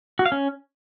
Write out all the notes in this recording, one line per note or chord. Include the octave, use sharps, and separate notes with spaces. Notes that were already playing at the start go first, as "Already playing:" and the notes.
F#4
F5
C#4